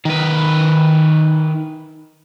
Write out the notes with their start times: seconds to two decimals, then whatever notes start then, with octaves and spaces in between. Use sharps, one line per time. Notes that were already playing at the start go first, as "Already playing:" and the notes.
0.05 D#3 B4